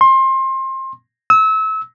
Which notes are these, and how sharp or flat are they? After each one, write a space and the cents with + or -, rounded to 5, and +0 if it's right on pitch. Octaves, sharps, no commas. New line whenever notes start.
C6 +25
E6 -30